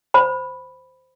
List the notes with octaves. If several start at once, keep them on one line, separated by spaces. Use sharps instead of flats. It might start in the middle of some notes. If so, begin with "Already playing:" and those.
C5 B5